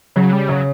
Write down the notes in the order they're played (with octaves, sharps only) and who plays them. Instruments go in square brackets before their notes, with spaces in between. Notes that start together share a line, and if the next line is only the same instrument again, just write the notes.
[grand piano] C#3 [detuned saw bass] F#3
[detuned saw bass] G3
[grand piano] C#3 [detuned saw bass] F#3